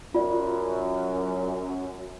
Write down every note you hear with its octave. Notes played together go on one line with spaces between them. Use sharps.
F#2 F4 D5